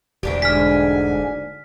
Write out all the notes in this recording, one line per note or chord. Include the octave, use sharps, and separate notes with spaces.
E1 D2 D4 G4
G#2 D3 G#5 F6 B6